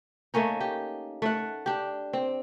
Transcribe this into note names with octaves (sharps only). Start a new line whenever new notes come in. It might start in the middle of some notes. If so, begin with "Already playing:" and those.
A3 A#3 C#4 D#4
G4
A3 F#5
D4 G4
C4